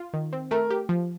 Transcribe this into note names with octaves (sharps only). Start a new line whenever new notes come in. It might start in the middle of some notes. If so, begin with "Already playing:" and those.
Already playing: F4
D#3
C4
A3 A#4
G4
F3